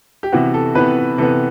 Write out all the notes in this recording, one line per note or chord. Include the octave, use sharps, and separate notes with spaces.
G4
C3 E3 B3 F#4
A4
C3 E3 B3 B4
C3 E3 B3 A4